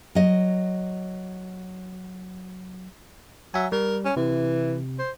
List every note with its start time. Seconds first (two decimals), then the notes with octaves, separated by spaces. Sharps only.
0.15 F#3 D#5
3.54 F#3 E5 G#5
3.72 G3 A#4
4.05 C#4
4.16 C3 E3
4.99 C5